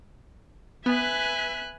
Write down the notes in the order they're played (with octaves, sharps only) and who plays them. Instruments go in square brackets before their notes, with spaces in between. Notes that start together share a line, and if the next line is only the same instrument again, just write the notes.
[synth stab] B3 [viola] B4 E5 [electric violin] G#5 F#6